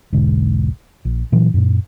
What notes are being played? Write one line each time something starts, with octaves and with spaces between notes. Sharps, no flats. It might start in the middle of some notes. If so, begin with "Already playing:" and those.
E1 B1 G#2 D3
A#1
A#2 E3 F#3
F#2 A#2